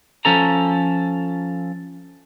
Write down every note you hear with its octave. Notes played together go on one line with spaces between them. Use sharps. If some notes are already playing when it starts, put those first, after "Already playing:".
F3 C#4 A4 A#5